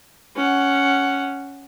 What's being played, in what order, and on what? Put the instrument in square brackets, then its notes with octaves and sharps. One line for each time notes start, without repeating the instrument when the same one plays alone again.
[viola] C#4 F#5